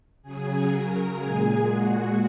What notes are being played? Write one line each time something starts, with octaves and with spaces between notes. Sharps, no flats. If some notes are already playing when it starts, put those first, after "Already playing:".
C#3 F#3 G#4 G#5
A#4 A#5
A#2 G#3 G#4 G#5
F#4 F#5